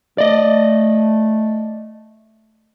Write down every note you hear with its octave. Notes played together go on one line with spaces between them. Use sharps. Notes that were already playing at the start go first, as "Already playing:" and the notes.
A3 D5 D#5